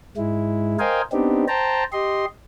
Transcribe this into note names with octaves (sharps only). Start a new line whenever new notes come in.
G#2 G#3 E4
A#4 C5 D#5 F5 G5 G#5
B3 C4 D4 D#4 G4
C5 G5 A5 A#5
G4 D#5 C6